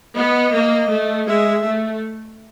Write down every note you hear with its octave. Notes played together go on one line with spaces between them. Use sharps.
B3 D#5
A#3
A3
G#3 E5
A3